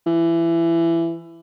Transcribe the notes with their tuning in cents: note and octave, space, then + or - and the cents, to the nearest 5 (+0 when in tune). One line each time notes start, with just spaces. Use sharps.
E3 +20